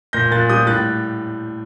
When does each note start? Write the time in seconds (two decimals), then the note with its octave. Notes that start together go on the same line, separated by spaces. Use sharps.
0.13 A#2 G6 A#6
0.31 A#2 F#6 A6
0.49 G3 D#6 G6
0.67 A2 F#6 A6